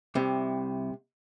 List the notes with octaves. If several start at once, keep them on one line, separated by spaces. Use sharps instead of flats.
C2 C3